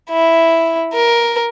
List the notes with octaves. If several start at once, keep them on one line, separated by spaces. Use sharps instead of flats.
E4
A#4